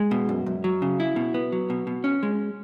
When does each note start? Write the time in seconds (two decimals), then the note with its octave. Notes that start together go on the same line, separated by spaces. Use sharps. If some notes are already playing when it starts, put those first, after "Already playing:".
Already playing: G#3
0.11 B2
0.29 F#2
0.46 F#2
0.64 F#3
0.82 C#3
1.00 E4
1.16 B2
1.34 B3
1.52 F#3
1.70 B2
1.87 B2
2.04 C#4
2.23 G#3